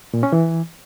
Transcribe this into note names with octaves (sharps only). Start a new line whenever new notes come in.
A#2
C#4
E3